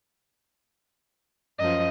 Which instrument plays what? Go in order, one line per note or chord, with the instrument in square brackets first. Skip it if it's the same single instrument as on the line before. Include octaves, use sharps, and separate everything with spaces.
[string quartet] F#2 F3 [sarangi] D#5